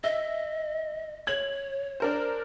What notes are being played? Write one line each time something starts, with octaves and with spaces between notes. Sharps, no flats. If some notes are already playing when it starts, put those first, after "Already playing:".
D#5 E5
C#5 G#6 F#7
D4 A#4 C5